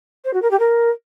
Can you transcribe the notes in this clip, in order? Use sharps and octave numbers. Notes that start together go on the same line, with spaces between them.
C5
F#4
A#4
G4
A#4